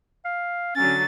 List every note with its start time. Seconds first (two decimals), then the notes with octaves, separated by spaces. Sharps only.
0.25 F5
0.76 D3 F#3 C#4 A6